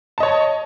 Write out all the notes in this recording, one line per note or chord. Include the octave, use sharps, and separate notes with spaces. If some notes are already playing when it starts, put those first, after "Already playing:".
C#5 D#5 A5